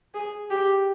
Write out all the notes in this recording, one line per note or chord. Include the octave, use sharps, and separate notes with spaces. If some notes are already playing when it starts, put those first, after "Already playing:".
G#4
G4